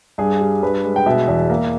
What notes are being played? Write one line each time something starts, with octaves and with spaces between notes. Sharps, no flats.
G2 G#4
G3
G2 B4
G#3
G5
B2 E5
E2
A#3